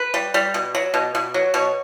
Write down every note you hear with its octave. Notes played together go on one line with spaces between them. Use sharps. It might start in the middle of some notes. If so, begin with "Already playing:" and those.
Already playing: B4
G3
G3
B2
F#3
B2
B2
F#3
B2 C#5